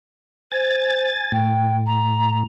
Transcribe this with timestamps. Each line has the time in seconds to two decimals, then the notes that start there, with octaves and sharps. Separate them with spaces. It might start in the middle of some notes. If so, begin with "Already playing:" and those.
0.52 C5 G#5 A6
1.32 A2 G5
1.86 A#5